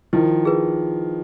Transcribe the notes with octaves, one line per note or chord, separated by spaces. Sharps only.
D#3 F3 E4
G#4 B4